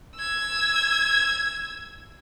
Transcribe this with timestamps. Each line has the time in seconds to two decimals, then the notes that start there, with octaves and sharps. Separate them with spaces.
0.16 E6 G#6